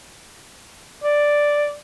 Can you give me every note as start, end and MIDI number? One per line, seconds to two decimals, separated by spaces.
1.03 1.74 74